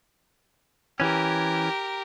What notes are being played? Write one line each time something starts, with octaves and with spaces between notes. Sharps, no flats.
E3 C#4 G4 A#4